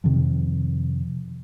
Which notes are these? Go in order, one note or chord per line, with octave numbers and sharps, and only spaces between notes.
F2 C3 D#3 F3